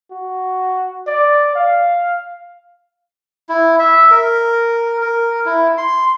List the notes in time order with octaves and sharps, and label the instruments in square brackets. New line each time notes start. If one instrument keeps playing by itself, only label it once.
[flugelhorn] F#4
D5
F5
[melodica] E4
E5
A#4
A#4
E4
C6